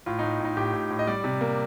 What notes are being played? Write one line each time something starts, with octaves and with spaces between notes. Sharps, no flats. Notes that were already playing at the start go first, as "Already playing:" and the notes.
A2 F4
D#4
A2
A2 D#4
A2 G4
A2
A2
D#5
G3 D5
C3
A#3